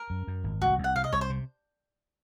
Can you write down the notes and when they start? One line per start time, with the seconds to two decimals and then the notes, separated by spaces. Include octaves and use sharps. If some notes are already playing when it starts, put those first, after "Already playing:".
Already playing: A#4
0.10 F#2
0.27 F#2
0.44 G#1
0.61 C2 F#4
0.78 C2
0.84 F#5
0.96 C3 F5
1.04 D#5
1.13 C2 C#5
1.21 C5
1.30 C3